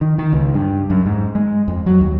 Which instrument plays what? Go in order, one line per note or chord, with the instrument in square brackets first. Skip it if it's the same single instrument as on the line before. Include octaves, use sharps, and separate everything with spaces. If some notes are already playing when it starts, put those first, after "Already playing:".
[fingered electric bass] D#3
D#3
C#2
G2
F#2
G#2
G#3
F2
F#3
D#2